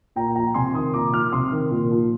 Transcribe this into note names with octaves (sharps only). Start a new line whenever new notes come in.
A#2 G5 A#5
F3 G5 A#5
C3 G#5 C6
D#3 C6 D#6
A#2 A#5 D6
F3 D6 F6
C3 C6 D#6
D#3
A#2
F3